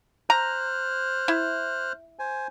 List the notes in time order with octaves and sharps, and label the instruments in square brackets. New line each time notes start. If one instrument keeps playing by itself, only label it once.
[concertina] C5 F6 F#6 [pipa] A#5
[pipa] E4
[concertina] C5 G#5